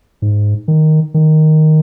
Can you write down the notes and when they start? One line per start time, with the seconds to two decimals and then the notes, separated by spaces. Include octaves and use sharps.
0.22 G#2
0.68 D#3
1.14 D#3